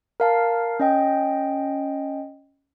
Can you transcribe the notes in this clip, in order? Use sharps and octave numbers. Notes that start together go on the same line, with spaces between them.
A#4 F5 A5
C#4 D#5 G5